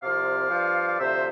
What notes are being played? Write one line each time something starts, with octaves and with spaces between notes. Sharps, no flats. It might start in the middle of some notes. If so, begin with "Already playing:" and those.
C2 C3 F3 D5 F5
G2 F3
F5
D2 C3 F3 C5 E5